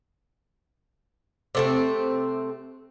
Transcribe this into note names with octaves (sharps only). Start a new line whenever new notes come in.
C3 A3 C4